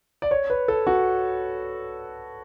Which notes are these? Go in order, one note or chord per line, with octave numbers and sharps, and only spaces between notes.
D5
C#5
B4
A4
F#4